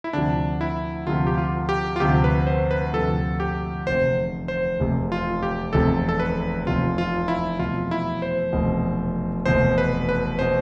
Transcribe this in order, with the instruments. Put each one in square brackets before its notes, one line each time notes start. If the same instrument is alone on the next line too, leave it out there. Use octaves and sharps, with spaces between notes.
[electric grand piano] E4
[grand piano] D2 C3 F3 [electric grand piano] D4
[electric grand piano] E4
[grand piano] D2 C3 F3 [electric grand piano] F4
[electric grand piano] G4
F4
G4
F4
[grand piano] D2 C3 F3 [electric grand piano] G4
[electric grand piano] B4
C5
B4
[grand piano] D2 C3 F3 [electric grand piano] A4
[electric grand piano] G4
[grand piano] F1 E2 C3 [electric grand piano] C5
[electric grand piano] C5
[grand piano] F1 E2 C3
[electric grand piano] F4
G4
[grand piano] F1 E2 C3 [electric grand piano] A4
[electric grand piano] A4
B4
[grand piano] F1 E2 C3 [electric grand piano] F4
[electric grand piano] F4
E4
[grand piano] F1 E2 B2 [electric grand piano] F4
[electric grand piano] E4
C5
[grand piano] F1 E2 B2
[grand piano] F1 E2 B2 [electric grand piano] C5
[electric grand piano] B4
B4
[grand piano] B2 [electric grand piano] C5